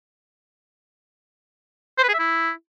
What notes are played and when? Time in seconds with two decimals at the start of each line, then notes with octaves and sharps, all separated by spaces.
1.98 C5
2.03 B4
2.09 G#4
2.14 E5
2.19 E4